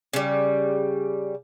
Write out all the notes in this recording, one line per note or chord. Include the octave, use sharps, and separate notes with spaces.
C#3 G3